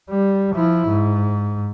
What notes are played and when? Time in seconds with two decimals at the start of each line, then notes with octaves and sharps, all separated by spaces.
0.10 G3
0.55 F3 E4
0.88 G#2